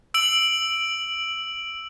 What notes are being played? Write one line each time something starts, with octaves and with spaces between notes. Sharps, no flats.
E6 D7 F#7